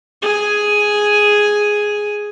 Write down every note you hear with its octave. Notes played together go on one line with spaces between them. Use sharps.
G#4 G#5